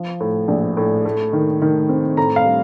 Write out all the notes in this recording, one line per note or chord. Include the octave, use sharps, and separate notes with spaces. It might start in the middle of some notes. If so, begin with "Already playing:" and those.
Already playing: F3
A2
A#1
A2
A3
D#3
D#3
C4
A2 A#5
F5
G3